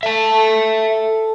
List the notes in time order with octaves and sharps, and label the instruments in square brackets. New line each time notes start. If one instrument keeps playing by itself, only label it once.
[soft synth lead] A4 [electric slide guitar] E5 A5